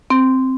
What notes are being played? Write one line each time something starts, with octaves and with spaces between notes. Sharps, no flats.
C4